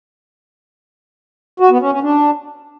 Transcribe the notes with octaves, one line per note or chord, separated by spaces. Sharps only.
F#4
B3
C#4
C#4
D4